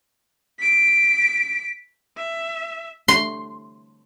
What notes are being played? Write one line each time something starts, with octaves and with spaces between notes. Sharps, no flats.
B6 D7
E5
C6